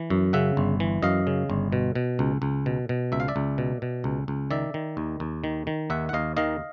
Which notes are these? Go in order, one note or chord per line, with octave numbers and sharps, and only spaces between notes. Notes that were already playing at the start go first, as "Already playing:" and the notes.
Already playing: E3
F#2
C#3 E5 F#5
G1
E3
F#2 D#5 F5
C#3
G1
B2
B2
C#2
C#2
B2
B2
C#2 E5
F5
D5 E5
C#2
B2
B2
C#2
C#2
D#3 D5 E5
D#3
D#2
D#2
D#3
D#3
D#2 E5 F#5
F#5
D#2 D#5 F5
D#3 D#5 F5